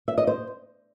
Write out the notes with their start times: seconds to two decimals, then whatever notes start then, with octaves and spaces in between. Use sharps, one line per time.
0.08 E5
0.18 D#5
0.27 C5